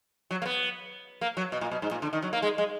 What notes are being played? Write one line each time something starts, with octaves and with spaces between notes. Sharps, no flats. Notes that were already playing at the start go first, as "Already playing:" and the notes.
F#3
A#3
B3
A#3
F#3
B2
A#2
B2
G#2
A#2
D3
D#3
F#3
A#3
G#3
G#3